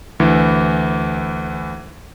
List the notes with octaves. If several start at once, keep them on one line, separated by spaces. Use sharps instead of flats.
D2 E3